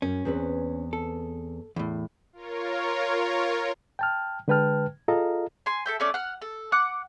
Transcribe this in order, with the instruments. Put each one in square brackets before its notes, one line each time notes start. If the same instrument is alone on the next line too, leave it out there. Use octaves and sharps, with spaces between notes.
[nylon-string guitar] F#2 [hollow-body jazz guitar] C#4
[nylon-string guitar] E2 C4 B4
[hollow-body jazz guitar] A4
E2 A2
[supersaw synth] F4 A#4 C#5
[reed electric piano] G5 A5 F6
D3 G#3 B4 G5 A5 F6
F4 G#4 A4 D#5 F5 A#5
[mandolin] G#5 C6
A4 E5 G5
A3 C#4 D5
F#5 F6
A4
F#5 D6 F#6